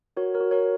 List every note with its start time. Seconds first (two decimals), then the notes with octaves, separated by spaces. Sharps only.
0.17 F#4 A#4 C#5
0.34 A#4 C#5
0.40 F#4
0.51 A#4 C#5